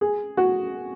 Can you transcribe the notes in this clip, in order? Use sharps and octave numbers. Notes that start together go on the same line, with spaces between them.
G#4
F#4